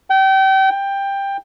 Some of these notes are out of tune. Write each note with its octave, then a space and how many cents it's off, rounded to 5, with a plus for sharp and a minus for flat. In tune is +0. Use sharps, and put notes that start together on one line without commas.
G5 -30
G5 +15